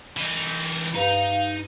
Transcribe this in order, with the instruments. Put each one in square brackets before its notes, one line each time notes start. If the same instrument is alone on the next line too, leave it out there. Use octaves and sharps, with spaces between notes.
[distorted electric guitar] E3 D#4
[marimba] G2 B4 [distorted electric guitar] D#4 A#5 [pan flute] F5